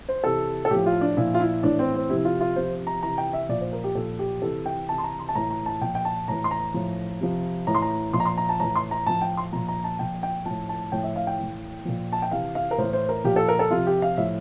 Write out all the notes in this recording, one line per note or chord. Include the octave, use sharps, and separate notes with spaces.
C5
C3 E3 A4
A4
A2 F3 G4
F4
D4
A#2 F3 E4
F4
E4
A2 E3 D4
C4
C4
C3 F3 E4
F4
F4
C3 F3 C5
A#5
C3 E3 A#5
G5
E5
A#2 F3 D5
C5
A#4
G4
A#2 F3 A4
G4
C3 E3 A4
G5
C3 E3 A5
C6
A#5
C6
A5
A2 E3 A#5
A#5
A5
A#2 F3 G5
G5
A5
A2 E3 A#5
C6
A#5
A2 F3
C3 F3
A2 E3 A#5
C6
A#5
A#2 F3 C6
A#5
C6
A#5
A5
A2 E3 A#5
C6
A#5
A2 F3 A5
G5
C6
A#2 F3 A#5
A#5
A5
A#2 F3 G5
G5
A2 F3 A5
A5
A2 F3 G5
E5
F5
G5
A2 E3
A#2 F3
A5
G5
C3 E3 F5
F5
A#4
A2 E3 C5
C5
A#4
A#2 F3 G4
A4
A#4
A4
C3 F3 F4
G4
F5
A2 F3 E5